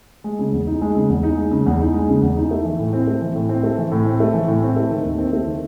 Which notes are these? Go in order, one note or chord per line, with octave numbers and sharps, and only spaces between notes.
G#3
C#3
E2
D#4
G#3
C#3
E2
D#4
G#3
C#3
E2
D#4
G#3
C#3
E2
D#4
A3
E3
A2
C4
A3
E3
A2
C4
A3
E3
A2
C4
A3
E3
A2
C4
A3
D#3
D#2
C4
A3
D#3